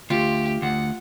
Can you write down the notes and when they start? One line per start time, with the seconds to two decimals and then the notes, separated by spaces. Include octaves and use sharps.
0.10 D2 F4 G4
0.62 D2 F#5